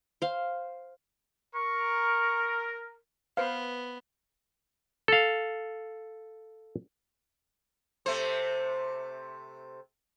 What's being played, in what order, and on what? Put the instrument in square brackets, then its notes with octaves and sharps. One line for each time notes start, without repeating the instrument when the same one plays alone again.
[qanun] C5 F5
[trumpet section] A#4 [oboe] C#6
[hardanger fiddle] B3 [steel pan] B4 C5 F5
[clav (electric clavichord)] A4 F5
[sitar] C3 A3 C5